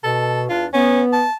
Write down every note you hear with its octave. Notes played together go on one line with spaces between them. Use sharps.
B2 A4
E2 D4 F4
B3 C#4
A5